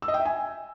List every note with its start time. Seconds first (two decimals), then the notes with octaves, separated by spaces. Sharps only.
0.02 E6
0.08 D#5
0.14 G5
0.20 E5
0.26 G#5